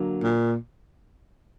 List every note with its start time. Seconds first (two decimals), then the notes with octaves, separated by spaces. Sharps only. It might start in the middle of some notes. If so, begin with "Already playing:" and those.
Already playing: D3 F#3 A#3
0.23 A#2